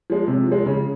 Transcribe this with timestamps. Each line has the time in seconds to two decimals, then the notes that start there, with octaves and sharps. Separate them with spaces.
0.10 F3 G#3
0.28 C3
0.47 F3 G#3
0.66 C#3